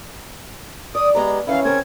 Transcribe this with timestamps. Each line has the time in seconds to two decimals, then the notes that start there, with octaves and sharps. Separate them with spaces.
0.95 D5 D#6
1.15 G#3 B3 G4 D5 A#5
1.47 D#3 E3 C#4 E4 F5
1.65 C#3 C4 A#4 G#6